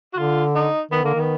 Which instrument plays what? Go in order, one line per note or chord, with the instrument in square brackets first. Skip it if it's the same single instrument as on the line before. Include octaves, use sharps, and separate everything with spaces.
[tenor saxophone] F#4
[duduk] D3 [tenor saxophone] F4
[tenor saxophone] D#4
[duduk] D#3 [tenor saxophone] B3
[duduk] D3 [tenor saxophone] A#3
[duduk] D#3
[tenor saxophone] B3